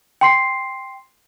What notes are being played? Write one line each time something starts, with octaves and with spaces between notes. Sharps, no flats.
G5 C6 C7